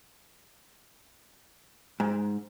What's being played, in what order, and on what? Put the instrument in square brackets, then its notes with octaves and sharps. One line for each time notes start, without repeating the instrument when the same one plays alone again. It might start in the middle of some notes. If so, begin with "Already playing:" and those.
[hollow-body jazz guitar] G#2